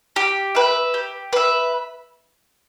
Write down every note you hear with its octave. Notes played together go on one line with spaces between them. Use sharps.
G4
B4 E5
G4
B4 E5